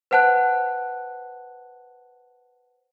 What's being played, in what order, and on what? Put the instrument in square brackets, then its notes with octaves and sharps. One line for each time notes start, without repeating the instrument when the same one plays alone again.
[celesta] B4 C5 F#5 A5 F#6